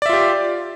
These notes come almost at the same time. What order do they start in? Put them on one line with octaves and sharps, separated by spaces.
D5 E5 F4 G4